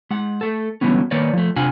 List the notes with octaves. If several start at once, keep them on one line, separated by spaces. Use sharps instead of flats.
G#3 F#5
A3 A4
D3 E3 F#3 G3 B3 C#4
D#3 A#3 D#4 B4 C#5 D5
F3 A3
C3 D4 F4 F#5 G#5